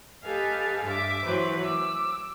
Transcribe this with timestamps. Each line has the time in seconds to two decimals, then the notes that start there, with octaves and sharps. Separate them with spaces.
0.23 G4 A4 B4 D#5 F5 G#5
0.85 G2 E5 D6
1.24 E3 F#3 B4 C5
1.63 D6 E6